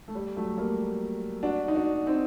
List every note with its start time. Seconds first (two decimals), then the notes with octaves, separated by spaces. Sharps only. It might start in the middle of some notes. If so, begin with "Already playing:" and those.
0.08 A3
0.15 G3
0.36 F#3 A3
0.58 G3 A#3
1.43 D4 F#4
1.68 D#4
1.75 D4 F#4
2.07 C4 D#4